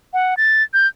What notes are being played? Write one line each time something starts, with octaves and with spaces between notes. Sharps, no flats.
F#5
A6
G6